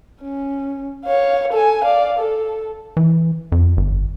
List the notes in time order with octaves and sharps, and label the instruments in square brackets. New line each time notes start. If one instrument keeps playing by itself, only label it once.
[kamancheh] C#4
C#5 F5
A4 G#5
D5 F5
A4
[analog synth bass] E3
F2
G1